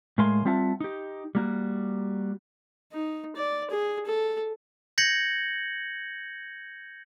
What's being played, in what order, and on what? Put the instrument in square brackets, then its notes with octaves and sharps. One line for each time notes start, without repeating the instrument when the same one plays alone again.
[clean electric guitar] A2 G#3 A#4 F5 G#5 C6
G3 C4 F4 E5 F#5 A5
D#4 G4
G3 A#3 F#4
[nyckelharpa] D#4
D5
G#4
A4
[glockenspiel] G6 G#6 A#6 C#7 F#7